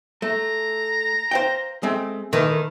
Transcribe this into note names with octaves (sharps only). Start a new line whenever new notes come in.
A3 A#5
C5 F5 G5
G#3 A3 C4
D#3 E3 A3 B4